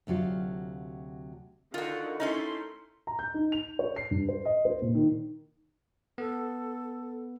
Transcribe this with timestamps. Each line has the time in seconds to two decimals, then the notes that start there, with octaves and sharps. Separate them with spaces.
0.07 D2 C3 F#3 F4 F5
1.74 D3 D#3 F4 F#4 F#5
2.20 A3 C#4 D#4 E4 C6
3.07 A#5
3.19 G6
3.34 D#4
3.52 F7
3.79 C#5
3.96 C7
4.11 G2
4.29 C5
4.45 D#5
4.65 C5
4.82 A#2
4.95 D#3
6.18 B3 A4